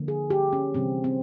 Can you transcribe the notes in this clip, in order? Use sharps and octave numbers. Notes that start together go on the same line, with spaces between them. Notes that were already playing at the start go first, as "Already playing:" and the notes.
Already playing: D3 F3 A#3
G#4
G4
C#4
C3 E3 G3 C4
C4